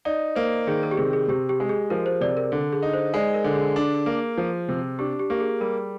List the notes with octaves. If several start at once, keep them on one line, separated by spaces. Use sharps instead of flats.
D#4 D5
A#3 C5
D#3 G#4
A#4
G4
C3 G#4
G#4
C3 G4
G4
G#3
G#4
F3 A#4
C5
C3 D5
A#4
D3
G#4
D#4
C5
G#3 D5
A#4
D3
G#4
D4
A#3
F3
C3
D4 G4
G4
A#3 G4
G#4
G3 A#4